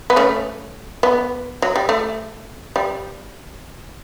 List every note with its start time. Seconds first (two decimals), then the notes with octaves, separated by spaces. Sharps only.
0.10 B3
0.16 A3 C#4
1.03 B3
1.62 F#3
1.76 G3
1.89 A3
2.76 G3